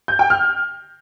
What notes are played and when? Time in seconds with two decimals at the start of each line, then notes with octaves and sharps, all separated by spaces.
0.08 G6
0.19 G5
0.30 F6